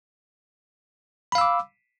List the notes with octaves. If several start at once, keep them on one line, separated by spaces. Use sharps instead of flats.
F5 B5 D6 E6